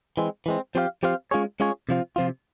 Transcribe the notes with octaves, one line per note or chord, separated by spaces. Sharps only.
E3 G#3 C4
E3 G#3 C4
F3 C4 G4 C5 F5
F3 C4 G4 C5 F5
G#3 C#4 F4 G#4 C#5
G#3 C#4 F4 G#4 C#5
C3 F3 C4 F4
C3 F3 C4 F4